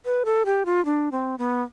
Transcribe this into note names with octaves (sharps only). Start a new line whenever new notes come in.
B4
A4
G4
F4
D4
C4
B3